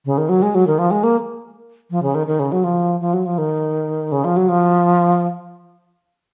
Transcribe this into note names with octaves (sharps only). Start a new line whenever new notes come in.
C#3
D#3
F#3
G#3
F#3
D#3
F3
G#3
A#3
F3
C#3
D#3
D#3
C#3
F#3
F3
F3
F#3
F3
D#3
C#3
F3
F#3
F3